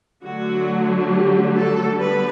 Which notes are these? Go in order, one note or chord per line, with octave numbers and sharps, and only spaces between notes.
D3 F#3 A3 F#4
G4
A4
D3 G3 B3 D4 B4